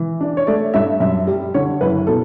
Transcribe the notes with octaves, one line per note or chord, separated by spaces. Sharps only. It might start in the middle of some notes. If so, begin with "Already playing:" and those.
Already playing: E3
D4
C#5
A3 D5
G2 E5
F#2 E5
G3
D3 C#5
F#1 B4
B2 A4